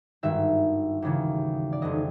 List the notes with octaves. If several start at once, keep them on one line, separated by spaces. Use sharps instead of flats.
G#1 G2 D#3 E5
D#2 C#3 E3
D5
F1 F2 C#3 D#5